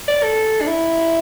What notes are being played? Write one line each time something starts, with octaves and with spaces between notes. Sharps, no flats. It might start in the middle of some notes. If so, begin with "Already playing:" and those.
D5
A4
D4
E4